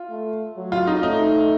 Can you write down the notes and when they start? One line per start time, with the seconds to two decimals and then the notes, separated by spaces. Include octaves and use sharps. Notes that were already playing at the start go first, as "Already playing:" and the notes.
Already playing: F4
0.10 A3
0.57 F#3
0.72 F4
0.87 D#4
1.03 A3 D#4